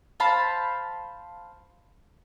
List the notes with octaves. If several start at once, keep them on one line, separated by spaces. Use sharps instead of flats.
C5 F5 A5 B5